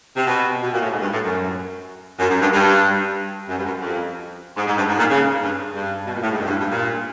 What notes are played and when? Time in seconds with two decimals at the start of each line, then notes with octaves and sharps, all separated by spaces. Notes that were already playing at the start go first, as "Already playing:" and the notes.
0.17 C3
0.27 B2
0.63 B2
0.72 A#2
0.81 A2
0.91 G#2
1.01 G2
1.12 A2
1.23 F#2
2.19 F#2
2.30 F#2
2.41 G2
2.52 G2
3.49 F#2
3.57 G2
3.65 F#2
3.81 F2
4.57 G#2
4.67 G#2
4.77 G2
4.88 G#2
4.98 A#2
5.10 C#3
5.42 G2
5.74 G2
6.06 B2
6.15 A#2
6.23 A2
6.31 G#2
6.38 G2
6.44 F#2
6.49 G2
6.60 G2
6.71 A#2